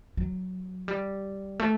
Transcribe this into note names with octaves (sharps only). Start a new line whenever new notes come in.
F#3
G3
A3